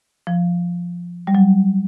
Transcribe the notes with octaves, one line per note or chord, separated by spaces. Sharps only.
F3
G3
F#3